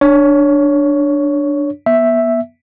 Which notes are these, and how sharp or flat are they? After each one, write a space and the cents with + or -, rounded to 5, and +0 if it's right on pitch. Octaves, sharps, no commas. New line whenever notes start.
D4 +0 C#5 +10
B3 -35 E5 +0